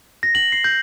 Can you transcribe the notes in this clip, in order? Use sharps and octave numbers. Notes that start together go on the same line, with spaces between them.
A#6
F#7
C7
G6